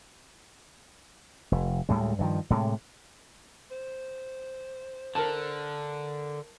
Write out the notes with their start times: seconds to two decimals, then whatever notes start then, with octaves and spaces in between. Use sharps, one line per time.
1.52 F1
1.89 D2 A2 G3 G#3
2.19 G2 D#3 F3
2.50 A2 C3 G3 G#3
3.71 C5
5.15 D3 A#4 A5